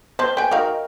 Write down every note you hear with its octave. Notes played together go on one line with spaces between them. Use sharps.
C4 B4 C5 A5
B4 G5 G#5
D#4 F#4 A#4 F5